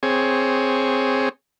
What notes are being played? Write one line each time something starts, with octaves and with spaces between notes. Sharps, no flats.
C4 G#4 C#5